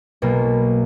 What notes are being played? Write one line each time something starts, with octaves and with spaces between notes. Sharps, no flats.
B1 B2 A#3